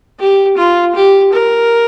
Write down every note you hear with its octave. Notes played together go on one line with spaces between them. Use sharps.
G4
F4
G4
A#4